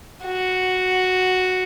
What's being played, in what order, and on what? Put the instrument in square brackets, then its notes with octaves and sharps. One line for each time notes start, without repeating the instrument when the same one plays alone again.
[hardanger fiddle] F#4